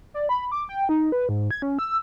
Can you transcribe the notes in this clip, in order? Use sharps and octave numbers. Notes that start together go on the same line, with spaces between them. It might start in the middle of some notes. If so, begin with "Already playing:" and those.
D5
B5
D6
G5
D#4
B4
G#2
G#6
C#4
E6